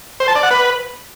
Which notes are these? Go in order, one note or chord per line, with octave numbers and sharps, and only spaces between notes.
C5
A5
D5
F#5
B4